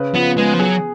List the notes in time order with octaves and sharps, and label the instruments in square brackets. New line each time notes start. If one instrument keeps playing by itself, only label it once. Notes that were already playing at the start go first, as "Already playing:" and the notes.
Already playing: [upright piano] C#3 B4
[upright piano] F3 [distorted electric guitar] B3
[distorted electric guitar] G#3 [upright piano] B3
[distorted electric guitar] F3
[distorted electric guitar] F#3 [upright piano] G#4